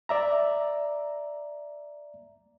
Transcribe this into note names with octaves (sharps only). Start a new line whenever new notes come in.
D5 E5 A#5